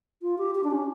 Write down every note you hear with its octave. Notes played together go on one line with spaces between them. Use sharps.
F4
G4
G4
D4
C#4